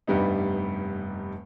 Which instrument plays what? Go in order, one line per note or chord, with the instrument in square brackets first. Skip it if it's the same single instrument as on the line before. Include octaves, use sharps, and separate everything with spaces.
[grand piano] F1 G2 G3 B3 D#4